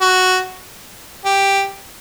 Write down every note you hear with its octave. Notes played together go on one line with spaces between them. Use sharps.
F#4
G4